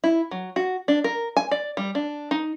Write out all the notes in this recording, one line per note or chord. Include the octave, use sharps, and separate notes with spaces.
E4
F#3
F#4
D4
A#4
G#5
D5
G3
D4
D#4